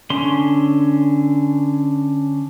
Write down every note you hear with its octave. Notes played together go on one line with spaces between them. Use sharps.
D3 C#4 C6